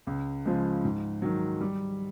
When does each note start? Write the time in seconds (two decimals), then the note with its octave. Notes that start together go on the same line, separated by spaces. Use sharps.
0.07 C#2
0.45 C#3 F3 G#3
0.84 G#2
1.22 D#3 F#3
1.61 G3